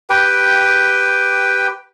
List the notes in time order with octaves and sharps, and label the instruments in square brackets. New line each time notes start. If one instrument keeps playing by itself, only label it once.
[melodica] G4 B4 G5